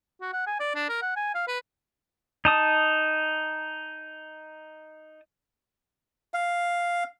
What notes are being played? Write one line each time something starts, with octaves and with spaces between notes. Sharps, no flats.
F#4
F#5
G#5
D5
D4
A#4
F#5
G#5
F5
B4
D#4 A5 D#6
F5